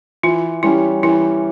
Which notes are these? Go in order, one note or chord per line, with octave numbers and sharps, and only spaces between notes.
E3 F4
G3 C#4 E4 G4
E3 E4